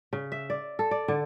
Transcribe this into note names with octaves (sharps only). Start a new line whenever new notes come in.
C#3
E5
D5
A4
D5
D3